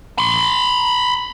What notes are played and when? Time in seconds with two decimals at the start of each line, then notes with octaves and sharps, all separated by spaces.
0.18 B5 C6